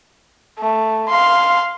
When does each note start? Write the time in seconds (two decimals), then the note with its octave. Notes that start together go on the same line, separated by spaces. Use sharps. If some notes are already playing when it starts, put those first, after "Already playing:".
0.59 A3
1.09 F5 C6